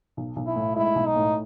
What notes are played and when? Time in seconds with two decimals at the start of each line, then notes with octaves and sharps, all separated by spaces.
0.17 B1
0.36 B1
0.47 E4
0.56 A2
0.76 G#3 E4
0.95 B1
1.06 D#4
1.16 A2